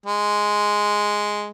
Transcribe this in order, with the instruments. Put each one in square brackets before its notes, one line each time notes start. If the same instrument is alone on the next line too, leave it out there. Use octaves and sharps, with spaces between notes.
[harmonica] G#3